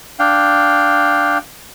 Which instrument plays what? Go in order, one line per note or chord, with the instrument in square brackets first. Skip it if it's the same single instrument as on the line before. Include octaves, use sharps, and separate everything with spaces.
[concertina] D4 F5 G5